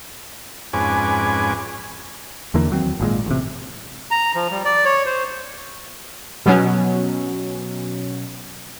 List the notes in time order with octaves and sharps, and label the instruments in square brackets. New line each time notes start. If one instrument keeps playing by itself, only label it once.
[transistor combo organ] F2 G#2 C#4 B4 G#5 D6
[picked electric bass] E2 D3 E3 A#3
D#2 F#3 C4
G#1 A#2 G#3
A1 C3
[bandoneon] A#5
F3
G3
D5
C#5
C5
[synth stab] B2 F#3 C#4